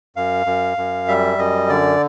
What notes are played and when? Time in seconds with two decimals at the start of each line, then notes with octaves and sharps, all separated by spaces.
0.16 F#2 F5
0.46 F#2
0.77 F#2
1.08 G3 E5
1.38 F#2 D#5
1.70 D3 D5